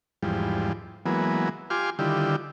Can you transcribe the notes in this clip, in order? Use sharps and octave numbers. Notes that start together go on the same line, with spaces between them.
E2 G#2 F3 G3
E3 F#3 G#3 A#3 B3
F4 G4 G#5 C6 D6 F6
D3 D#3 G3 E4 F4 G4